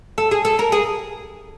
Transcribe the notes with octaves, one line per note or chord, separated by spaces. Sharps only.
A4
G#4
A4
A#4
G#4